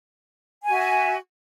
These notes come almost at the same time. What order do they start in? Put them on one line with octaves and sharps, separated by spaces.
G#5 F#4 E5